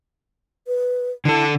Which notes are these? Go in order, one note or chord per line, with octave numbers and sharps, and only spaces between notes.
B4
D3 E4 A4